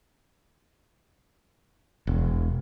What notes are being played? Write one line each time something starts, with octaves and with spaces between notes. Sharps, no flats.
E1